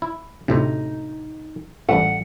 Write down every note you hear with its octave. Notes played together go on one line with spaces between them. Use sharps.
E4
D2 A2 C3 D#4
A1 G3 A3 F#5